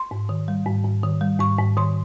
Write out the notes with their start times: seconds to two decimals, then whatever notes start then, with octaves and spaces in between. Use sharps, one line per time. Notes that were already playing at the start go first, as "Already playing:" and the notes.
Already playing: C6
0.11 G#2
0.29 D#3
0.48 G3
0.67 G#2
0.85 G#2
1.03 D#3
1.21 G3
1.40 G#2 C#6
1.58 G#2
1.77 D#3 C6